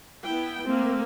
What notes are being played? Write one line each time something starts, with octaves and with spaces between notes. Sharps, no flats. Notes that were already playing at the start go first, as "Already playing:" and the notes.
B3 E4 G5
A3 A#3 C4